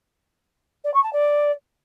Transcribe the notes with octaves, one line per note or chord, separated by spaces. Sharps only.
D5
C#6
A5
D5